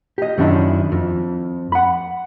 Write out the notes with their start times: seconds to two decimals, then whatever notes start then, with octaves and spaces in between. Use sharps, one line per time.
0.18 G4 D#5
0.38 F#2 D#3 C#4 D4 E4
0.92 F2
1.72 F#5 B5